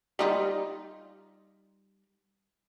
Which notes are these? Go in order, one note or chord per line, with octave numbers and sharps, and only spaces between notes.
G3 D#4 F4